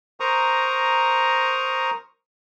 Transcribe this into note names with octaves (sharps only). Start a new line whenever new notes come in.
A#4 C5 A#5 C#6 D#6